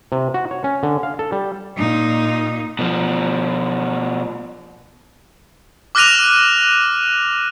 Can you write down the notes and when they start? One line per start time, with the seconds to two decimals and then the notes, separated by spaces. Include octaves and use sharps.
0.12 C3
0.34 F#4
0.51 C#5
0.64 C#4
0.83 D3
1.03 F5
1.19 A4
1.32 G3
1.77 A#2 D#4
2.79 B2 F3
5.95 D6 F6 F#6 A#6 D#7 F7